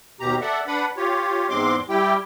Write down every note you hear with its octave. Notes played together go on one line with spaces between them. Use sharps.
D#2 B2 G4 A#5
A4 D5 E5 F#5
D4 B4 F#5 B5
F4 G4 C#5
E2 G#2 G#3 C4 C6 D6
G3 E4 G4 G5